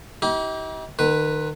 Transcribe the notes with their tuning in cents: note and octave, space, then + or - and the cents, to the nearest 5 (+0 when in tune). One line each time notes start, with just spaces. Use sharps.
D#4 +45 G4 -25
D#3 -35 B4 +0